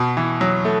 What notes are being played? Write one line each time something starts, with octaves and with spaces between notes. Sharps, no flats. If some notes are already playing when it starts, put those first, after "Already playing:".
Already playing: B2
E3
F#3
A3